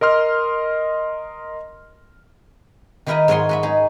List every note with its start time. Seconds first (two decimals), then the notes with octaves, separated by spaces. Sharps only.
0.01 A#4 D#5 C6 F6
3.06 D#3 D#4 E4 A#4 B4 D#5
3.28 G#2 F#3 C#5 D#5 G#5 C6
3.49 F#4 B4 E5
3.63 D#4 G#4